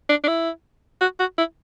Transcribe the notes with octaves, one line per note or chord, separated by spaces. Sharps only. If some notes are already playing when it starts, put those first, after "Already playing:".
D4
D4
E4
F#4
F#4
E4